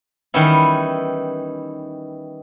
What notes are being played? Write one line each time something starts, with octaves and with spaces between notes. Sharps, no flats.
D#3 E3 G3 B3 C#4 E4